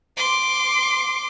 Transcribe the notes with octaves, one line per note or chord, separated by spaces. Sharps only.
C6 D6